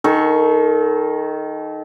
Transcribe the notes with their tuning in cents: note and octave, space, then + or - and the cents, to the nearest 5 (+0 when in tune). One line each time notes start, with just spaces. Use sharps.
D#3 +0 A4 -30 C#6 +0